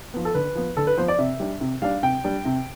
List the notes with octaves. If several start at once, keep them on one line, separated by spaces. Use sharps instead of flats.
F3 B3
A4
D3 B4
F3 B3
D3 A4
B4
F3 B3 C5
D5
C3 E5
G3 D4
C3
G3 D4 F5
C3 G5
G3 D4
C3